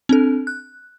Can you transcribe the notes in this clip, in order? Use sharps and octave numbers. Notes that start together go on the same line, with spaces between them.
C4 D4 A4
F#6